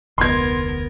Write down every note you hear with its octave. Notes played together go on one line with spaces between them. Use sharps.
F1 D2 B3 A#4 C6 G#6